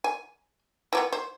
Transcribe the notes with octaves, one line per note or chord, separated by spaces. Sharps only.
G#5
E3 F3 B3
C5